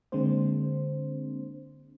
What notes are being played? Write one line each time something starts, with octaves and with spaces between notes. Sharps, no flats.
D3 G#3 A#3 C4 D4 C5